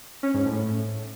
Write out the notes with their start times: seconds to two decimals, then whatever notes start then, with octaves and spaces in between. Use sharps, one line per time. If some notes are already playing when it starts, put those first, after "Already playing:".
0.23 C#4
0.34 G#2
0.46 A2